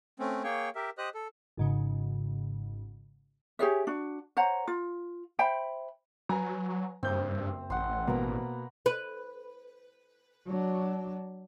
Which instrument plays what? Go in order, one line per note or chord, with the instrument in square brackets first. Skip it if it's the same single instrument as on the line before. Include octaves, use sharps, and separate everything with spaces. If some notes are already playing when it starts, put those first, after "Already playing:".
[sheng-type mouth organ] A3 C4 C#4
A#3 G#4 C#5 G5 C#6
G4 A#4 E5
G4 C5 D#5 D#6 F#6
A4
[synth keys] G#1 G#2 C#3
[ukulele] G4 G#4 C#5 E5
D4 F#4
C5 C#5 F#5 A#5
F4
C5 E5 G5 B5
[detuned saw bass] F#3 [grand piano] B4 G#5 A#5
[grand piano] F#1 G6 [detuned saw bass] G2 [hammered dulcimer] C4
[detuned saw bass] A1 [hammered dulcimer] F#5 C6
[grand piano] B2 A#3 B4 [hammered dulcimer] A#5 B5
[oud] B4
[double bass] F#3 D4